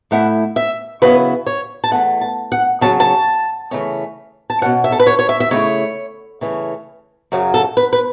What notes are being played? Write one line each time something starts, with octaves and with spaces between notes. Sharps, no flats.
A2 A3 E4 F#5
E5
C#3 F#3 B3 E4 B4
C#5
A5
E2 E3 A3 F#5
A5
F#5
C#3 F#3 C#4 A5
A5
C#3 E3 A3 C#4
A5
B2 F#3 C#4 F#5
E5
A4
B4
C#5
C#5
E5
E5
C#3 A3 E4 C#5
C#3 E3 A3 C#4
F#2 C#3 F#3
A4
B4
B4